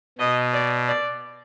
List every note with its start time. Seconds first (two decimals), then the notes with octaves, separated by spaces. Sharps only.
0.18 B2 D#5
0.53 D5
0.88 D5